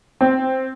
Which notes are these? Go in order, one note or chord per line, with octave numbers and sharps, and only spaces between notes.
C4